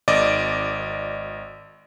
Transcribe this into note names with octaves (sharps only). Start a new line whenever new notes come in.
G#1 D5 D#5 D6